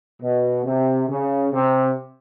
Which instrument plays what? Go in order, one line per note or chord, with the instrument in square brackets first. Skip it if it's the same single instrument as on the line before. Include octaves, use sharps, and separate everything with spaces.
[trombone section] B2
C3
C#3
C3